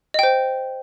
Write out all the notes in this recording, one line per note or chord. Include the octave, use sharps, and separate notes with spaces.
C5 D#5 G5